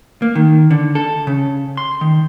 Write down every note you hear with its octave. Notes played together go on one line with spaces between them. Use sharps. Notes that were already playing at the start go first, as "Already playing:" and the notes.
A#3
D#3
D3
A4
C#3
C6
D#3